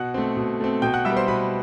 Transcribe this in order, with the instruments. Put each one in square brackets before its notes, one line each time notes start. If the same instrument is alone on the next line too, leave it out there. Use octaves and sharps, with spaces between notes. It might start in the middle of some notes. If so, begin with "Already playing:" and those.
Already playing: [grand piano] B2 F#5 F#6
A3 C4
B2
A3 C4
B2 G5 G6
F#5 F#6
G3 B3 E5 E6
C5 C6
B2 B4 B5